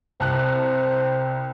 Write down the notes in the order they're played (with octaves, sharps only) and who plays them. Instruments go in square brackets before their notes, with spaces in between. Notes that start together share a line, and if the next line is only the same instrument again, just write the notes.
[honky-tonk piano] C2 A5 F#6 [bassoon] C4